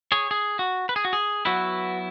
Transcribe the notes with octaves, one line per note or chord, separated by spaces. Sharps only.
G#4 C#5
G#4
F#4
B4
G#4
F#4
G#4
F#3 B3 E4 F#4 B4